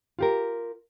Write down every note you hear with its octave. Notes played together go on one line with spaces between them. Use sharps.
F4 G4 A#4